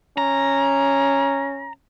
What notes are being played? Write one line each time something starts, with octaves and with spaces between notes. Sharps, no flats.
C#4 A#5